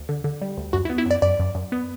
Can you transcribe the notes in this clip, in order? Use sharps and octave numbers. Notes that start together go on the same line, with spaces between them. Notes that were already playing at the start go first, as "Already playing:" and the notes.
Already playing: D2
D3
D3
G3
D2
F#2 F#4
E4
B3
E4
F#2 D5
F#2 D5
F#2
F#2
B3